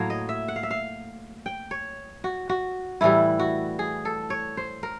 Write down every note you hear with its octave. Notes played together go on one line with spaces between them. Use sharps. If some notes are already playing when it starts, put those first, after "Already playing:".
Already playing: A2 F#3 A#3 C#5
D#5
E5
F#5
F5
E5
F5
G5
C#5
F#4
F#4
A2 E3 G3 E4
F#4
G#4
A4
C#5
C5
A#4